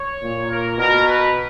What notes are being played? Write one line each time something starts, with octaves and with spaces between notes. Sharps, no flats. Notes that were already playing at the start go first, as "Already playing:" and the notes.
Already playing: C#5
A#2
A#4
B2 A#4
B4